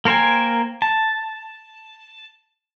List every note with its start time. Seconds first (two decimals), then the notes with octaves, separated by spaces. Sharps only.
0.05 A#3 A#4 C5 G5 G#5
0.82 A5